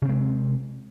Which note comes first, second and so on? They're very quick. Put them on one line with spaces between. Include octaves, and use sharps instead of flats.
C3 C4 G#3